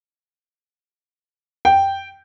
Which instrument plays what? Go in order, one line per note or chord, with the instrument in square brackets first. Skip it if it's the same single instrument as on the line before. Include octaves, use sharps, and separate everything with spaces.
[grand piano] G5